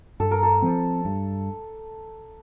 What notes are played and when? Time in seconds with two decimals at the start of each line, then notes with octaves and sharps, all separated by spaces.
0.20 G2 A4
0.31 A#4
0.43 A4
0.62 F3 C4
1.05 G2